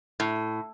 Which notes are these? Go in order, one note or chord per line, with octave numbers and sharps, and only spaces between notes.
A2